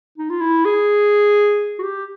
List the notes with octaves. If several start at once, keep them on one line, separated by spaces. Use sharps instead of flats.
D#4
F4
E4
G#4
F#4
G4